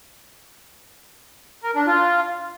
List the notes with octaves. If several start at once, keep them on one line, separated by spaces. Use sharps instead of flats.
A#4
D4
F4